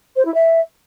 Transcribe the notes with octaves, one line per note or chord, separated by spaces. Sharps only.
C5
E4
E5